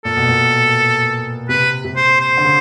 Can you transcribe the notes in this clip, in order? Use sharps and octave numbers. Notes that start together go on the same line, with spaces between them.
A#2 A4
B2
A#2
C3 B4
C3
C5
C5
D3
C#3